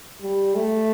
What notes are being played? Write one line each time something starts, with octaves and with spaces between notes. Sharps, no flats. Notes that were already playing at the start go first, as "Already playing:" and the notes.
G3
A3